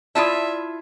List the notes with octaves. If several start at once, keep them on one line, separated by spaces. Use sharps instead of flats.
E4 F4 D5 E5 A5 D#6